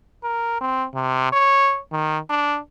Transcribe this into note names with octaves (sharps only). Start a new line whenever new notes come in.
A#4
C4
C3
C#5
D#3
D4